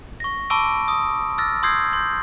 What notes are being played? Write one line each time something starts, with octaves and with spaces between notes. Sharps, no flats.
C#6 A#6
A5 B5 C#6 D6 E6 D7
D#6
E6 F6 A6 A#6
C6 D#6 E6 G6 G#6 C7
C6 G6